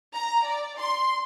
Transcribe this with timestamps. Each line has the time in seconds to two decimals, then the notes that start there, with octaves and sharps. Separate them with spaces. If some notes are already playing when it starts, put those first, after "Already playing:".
0.15 A#5
0.45 D5
0.78 C6